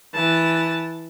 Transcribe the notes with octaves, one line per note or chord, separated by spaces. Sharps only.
E3 A5